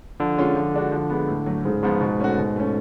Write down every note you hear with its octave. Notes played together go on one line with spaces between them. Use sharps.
D3 F3
G#3 C#4 F4
F3
G#3 D4 F#4
F3
G#3 B3
A2
F#3 A3
G#2 C#3
G#2 F3 B3 F4
B2
A3 C#4 F#4
B2
A3 C#4